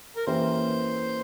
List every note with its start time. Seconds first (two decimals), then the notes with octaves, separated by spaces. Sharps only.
0.17 A#4
0.27 E3 A#3 C#4 G4 A#4 C5